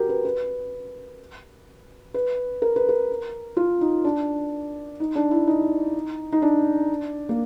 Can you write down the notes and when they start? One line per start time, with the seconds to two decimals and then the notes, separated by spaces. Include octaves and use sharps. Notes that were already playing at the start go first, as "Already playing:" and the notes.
Already playing: F#4 G4 A#4
0.09 B4
0.25 B4
2.14 B4
2.62 A#4
2.76 B4
2.89 A#4
3.57 F4
3.81 D#4
4.04 D4
5.00 D#4
5.16 D4
5.31 E4
5.48 D#4
6.32 D#4
6.42 D4
7.29 A#3